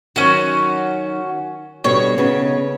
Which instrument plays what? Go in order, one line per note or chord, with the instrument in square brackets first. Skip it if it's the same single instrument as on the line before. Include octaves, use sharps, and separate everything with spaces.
[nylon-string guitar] D#3 F#3 [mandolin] C#4 F#4
[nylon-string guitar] B2 D3 G3 [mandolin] C#5
[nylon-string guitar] C#3 B3 D#4